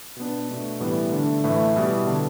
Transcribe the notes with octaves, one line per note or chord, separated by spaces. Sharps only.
B2 B3 D4
B2 A3 D4
A2 E3 G3 B3 E4
D3 A3 D4
A2 E3 A3 E4
B2 G3 E4
D3 B3 D4